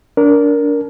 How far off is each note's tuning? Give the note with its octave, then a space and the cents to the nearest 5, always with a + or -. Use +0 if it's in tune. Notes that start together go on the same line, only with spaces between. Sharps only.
D4 -25 A#4 +0